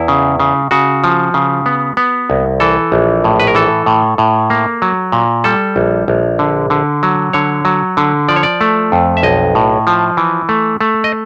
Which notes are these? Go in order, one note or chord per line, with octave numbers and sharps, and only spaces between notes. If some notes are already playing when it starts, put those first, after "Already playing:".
Already playing: E2 E4
C#3
C#3
C#3 F#4
F3
C#3
B3
B3
C2
E3 A4
A#1
A2
B4
A#4
E3 A4
A2
A2
A#3
F#3
A#2
G3 A4
A#1
A#1
D3
D3
F#3
D3 C#5
F#3
D3
F3 D5
C#5
D5
A3
F2
E5
B1 D#5
A2
F3
E3
A3
A3
D#5